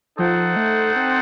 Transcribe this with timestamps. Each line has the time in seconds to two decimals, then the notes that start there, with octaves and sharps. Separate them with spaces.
0.18 F3 D#4 A4 C5 F#5
0.56 A3
0.96 C4